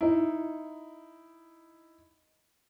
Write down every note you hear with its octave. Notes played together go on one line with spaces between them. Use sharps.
D#4 E4